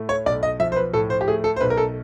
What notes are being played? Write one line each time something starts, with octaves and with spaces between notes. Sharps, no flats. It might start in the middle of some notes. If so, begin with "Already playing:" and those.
Already playing: A2 A3
C#5
B1 D5
D#5
F3 E5
C5
B4
A2 A4
C5
G4
A3 G#4
A4
C5
B1 B4
A#4
A4